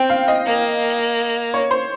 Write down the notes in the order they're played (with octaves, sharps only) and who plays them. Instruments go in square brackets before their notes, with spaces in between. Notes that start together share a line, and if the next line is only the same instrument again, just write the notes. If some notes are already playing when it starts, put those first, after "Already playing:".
Already playing: [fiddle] C4 [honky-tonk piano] G5
[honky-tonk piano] F5
D#5
[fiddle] A#3
[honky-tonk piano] C#5
C5